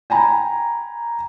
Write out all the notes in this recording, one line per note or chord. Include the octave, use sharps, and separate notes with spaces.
G5 G#5 A#5 B5